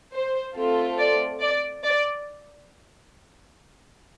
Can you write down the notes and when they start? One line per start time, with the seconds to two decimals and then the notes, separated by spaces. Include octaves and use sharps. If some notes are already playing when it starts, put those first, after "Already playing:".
0.13 C5
0.55 A3 C4 F4 A4
0.99 D5
1.41 D5
1.84 D5